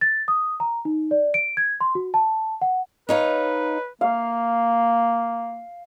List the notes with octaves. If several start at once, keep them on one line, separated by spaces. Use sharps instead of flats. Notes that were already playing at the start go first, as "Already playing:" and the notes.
A6
D#6
A#5
D#4
D5
D7
G#6
C6
F#4
A5
F#5
D#4 B4 C#5 F5
A#3 F5